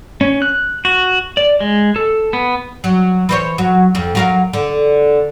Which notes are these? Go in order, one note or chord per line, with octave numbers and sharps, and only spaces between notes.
C#4
F#6
F#4
D5
G#3
A4
B3
F#3
E3 C5 C#5
F#3
F2
F#3 A#4 F5
D3